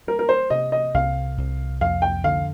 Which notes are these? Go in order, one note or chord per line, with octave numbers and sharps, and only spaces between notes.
G3 A#4
A#4
C5
C3 D#5
D#5
C2 F5
C2
F2 F5
G5
D3 F5